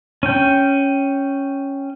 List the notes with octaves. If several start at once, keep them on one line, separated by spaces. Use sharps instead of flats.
C#4 G5